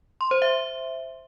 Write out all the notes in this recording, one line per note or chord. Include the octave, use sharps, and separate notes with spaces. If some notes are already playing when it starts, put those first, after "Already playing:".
C6
C5
E5